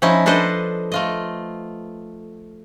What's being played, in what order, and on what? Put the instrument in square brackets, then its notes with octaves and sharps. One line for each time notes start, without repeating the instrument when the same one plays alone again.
[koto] F3 C#4 D#4 E4
D4 A4 B4 C5 D#5
A3 F4 D#5